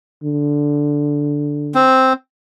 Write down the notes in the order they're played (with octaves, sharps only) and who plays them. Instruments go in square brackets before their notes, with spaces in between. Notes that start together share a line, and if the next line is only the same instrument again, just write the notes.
[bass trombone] D3
[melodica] C4